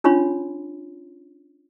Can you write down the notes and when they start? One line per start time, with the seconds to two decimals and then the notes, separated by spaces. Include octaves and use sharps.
0.04 C#4 D4 F4 C#5 B5 C6